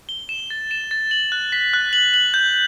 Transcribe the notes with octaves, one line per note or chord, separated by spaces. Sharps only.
G7
E7
A6
E7
A6
F#7
F#6
B6
F#6
F#7
F#7
G6